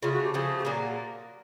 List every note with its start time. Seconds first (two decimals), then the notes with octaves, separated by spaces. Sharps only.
0.03 C#3 F3 A3 F4
0.13 F#4
0.23 G4
0.34 C#3 F3 A3 G#4
0.58 G4
0.65 A#2 F#3 A#3 G#4